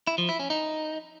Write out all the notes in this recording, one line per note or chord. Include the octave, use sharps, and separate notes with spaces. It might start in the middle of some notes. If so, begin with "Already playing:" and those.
E4
F3
E4
C#4
D#4